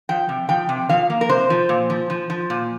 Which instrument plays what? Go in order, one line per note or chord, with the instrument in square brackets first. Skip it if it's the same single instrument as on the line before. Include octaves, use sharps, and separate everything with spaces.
[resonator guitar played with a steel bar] F3 G5
C3
F3 G5
C3
F3 F5
A#3
A#4
C3 C5
F3
A#2
F3
F3
F3
A#2